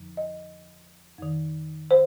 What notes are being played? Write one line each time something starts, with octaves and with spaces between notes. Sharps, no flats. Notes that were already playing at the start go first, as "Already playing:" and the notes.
Already playing: F2 D3 F3
D#5
F2 D#3
C5